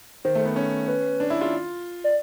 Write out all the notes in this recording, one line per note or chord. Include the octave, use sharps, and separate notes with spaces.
D#3 C5
A3
B3
C#4
B4
D4
E4
F4
D5